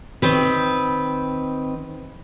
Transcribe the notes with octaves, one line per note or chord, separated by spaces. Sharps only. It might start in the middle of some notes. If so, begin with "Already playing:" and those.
D#3 C4 B4